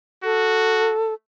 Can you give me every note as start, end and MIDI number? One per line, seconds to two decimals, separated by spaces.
0.24 0.95 66
0.24 1.14 69